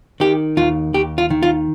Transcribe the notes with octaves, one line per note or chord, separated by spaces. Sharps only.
D#3 G4
D#2 F4
D#2 G4
F4
D#3
F4